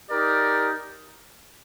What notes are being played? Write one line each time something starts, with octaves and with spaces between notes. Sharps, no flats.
D#4 G4 A#4 D5